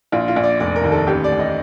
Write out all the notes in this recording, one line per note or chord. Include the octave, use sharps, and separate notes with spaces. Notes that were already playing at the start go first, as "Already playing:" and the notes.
A#1 F4
F4
A#1
D5
F1 D5
A#4
D#2
A4
A1 G4
D5
A1
D#5